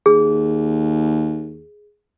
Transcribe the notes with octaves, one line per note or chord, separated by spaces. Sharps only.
D#2 G#4